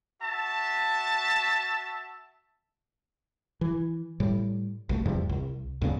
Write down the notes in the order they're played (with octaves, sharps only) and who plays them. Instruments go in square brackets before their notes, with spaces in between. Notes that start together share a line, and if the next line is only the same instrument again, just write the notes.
[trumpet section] F#4 E5 A5
[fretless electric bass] E3
A2 G3
B1 D#3 A3
E2 G2 C3 F3
C2
D2 G2 C#3 B3